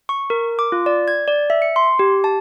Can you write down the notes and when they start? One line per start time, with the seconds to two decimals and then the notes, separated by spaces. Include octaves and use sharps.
0.09 C#6
0.30 A#4
0.59 D6
0.72 F4
0.86 D5
1.08 G#6
1.28 D5
1.50 E5
1.62 C#7
1.76 C6
1.99 G4
2.24 A5